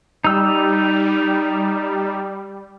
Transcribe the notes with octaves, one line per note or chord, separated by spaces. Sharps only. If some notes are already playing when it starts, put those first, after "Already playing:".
G3 D#4 E6